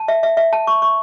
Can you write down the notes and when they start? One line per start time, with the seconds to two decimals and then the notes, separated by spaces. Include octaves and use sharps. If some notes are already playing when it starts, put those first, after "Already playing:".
Already playing: A5
0.08 E5
0.23 E5
0.37 E5
0.53 A5
0.67 C#6
0.82 C#6